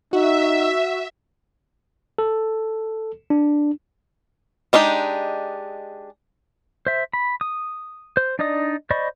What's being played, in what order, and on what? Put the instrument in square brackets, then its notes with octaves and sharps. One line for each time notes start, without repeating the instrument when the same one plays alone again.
[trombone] D#4 [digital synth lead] F#4 [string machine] E5
[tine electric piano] A4
D4
[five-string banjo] G#3 D4 D#4 G4
[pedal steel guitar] C5 E5
B5
D#6
C5
D4 D#4 D5 D#5 D#6
C5 D5 D#5 B5 C#6